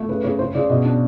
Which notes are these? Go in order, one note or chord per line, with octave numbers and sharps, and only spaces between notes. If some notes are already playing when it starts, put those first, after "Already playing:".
Already playing: A3
C#3 B4
C#3 C#5
C#3 C5
C#3 D5
B2 D#5
D4